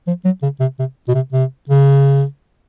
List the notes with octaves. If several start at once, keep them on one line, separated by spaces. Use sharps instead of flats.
F3
F#3
C#3
C3
C3
B2
C3
C3
C#3